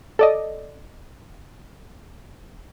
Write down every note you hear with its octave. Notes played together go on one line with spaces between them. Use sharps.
A4 D5 D#5